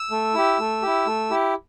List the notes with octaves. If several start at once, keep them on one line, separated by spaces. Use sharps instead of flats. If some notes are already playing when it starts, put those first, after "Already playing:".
Already playing: E6
A3
E4 G4
A3
E4 G4
A3
E4 G4